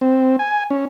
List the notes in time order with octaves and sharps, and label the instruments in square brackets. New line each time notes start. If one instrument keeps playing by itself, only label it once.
[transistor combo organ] C4
G#5
C#4